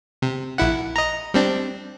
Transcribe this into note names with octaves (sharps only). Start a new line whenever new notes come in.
C3
A#1 E4 F#5
D#5 A#5
G3 C4 D4